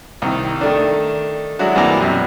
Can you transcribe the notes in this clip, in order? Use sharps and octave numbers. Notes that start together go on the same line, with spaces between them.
C2 D#3
D#3 A3 D4
F#3 G#3 D4 E4 F#4
G2 C3 E3 A#3 D5 A#5
F#2 B2